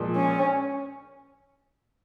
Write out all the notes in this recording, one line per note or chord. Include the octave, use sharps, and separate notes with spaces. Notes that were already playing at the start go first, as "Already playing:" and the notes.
Already playing: A#2 F3 G#3
C#4